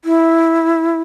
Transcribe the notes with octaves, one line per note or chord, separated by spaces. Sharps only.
E4